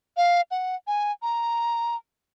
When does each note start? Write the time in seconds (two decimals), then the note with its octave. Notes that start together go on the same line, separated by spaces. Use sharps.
0.17 F5
0.51 F#5
0.87 G#5
1.22 A#5